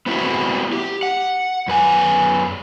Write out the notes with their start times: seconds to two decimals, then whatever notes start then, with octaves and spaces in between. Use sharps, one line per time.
0.06 B3 C4 E4 F#4
0.73 G4
1.03 F#5
1.68 F#2 B4 G#5